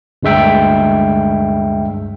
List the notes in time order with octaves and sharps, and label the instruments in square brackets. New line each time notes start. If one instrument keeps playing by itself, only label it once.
[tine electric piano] D2 G2 G#3 E5 G5